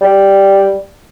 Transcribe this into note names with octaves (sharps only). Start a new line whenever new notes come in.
G3